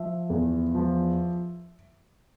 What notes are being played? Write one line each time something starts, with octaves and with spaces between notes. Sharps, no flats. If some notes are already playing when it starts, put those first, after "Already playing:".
Already playing: F3 E5
E2
F3